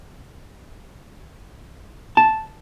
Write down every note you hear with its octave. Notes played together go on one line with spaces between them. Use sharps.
A5